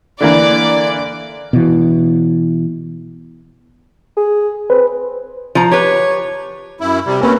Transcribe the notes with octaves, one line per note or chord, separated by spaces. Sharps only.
D3 E3 A#3 D5
B2 E3
G#4
C4 B4
F3 A#5
G4 B4 C#5
F#2 E4
C3 G3
D2 A#3 C4 C#4 B4